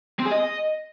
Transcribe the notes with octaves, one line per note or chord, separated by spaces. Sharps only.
C4
G#4
D#5